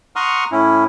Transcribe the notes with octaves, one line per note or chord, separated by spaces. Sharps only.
F#5 A#5 C6 C#6 D#6 F6
A2 C#4 E4